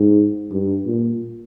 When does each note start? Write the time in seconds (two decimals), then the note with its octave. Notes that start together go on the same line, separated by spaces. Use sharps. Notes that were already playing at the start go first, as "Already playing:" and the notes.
Already playing: G#2
0.52 G2
0.87 A#2